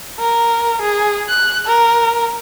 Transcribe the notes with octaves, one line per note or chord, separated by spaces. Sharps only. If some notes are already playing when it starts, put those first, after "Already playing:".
A#4
G#4
F#6
A#4